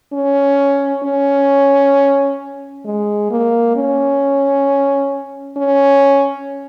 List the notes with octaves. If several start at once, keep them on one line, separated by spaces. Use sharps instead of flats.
C#4
C#4
G#3
A#3
C#4
C#4